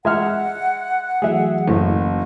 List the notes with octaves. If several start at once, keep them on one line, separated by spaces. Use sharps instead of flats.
G#3 E5 F#5 F6
E3 F#3 A3 G#4 E5
F#1 A2